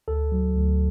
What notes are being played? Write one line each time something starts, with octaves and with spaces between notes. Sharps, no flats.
D2 A4
F#3
D2